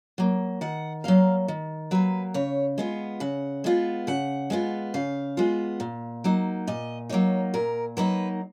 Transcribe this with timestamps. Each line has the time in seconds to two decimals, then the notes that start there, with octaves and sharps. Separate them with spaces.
0.18 F#3 A#3
0.61 D#3 F#5
1.04 F#3 A#3 F5
1.48 D#3
1.91 F#3 A#3 B4
2.34 C#3 C#5
2.78 G#3 B3 F4
3.20 C#3 F#5
3.64 G#3 B3 F4
4.07 C#3 F#5
4.50 G#3 B3 F4
4.94 C#3 F5
5.37 G#3 B3 F4
5.80 A#2
6.24 F#3 A#3 D#4
6.67 A#2 D#5
7.09 F#3 A#3 D#4 C#5
7.54 A#2 A#4
7.97 F#3 A#3 D#4 B4